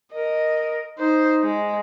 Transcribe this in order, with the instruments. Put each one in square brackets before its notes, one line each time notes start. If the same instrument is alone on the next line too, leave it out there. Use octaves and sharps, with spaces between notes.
[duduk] A#4 [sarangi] D#5
[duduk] D#4 [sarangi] C5
[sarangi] G#3